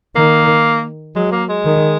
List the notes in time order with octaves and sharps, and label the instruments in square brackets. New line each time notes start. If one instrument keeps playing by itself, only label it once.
[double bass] D#3 [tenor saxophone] A#3
[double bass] F#3 [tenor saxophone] G#3
[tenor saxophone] A#3
G#3
[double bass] D#3